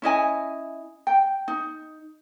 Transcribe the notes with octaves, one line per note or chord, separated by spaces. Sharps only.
C#4 E4 D#5 G#5
G5
D#4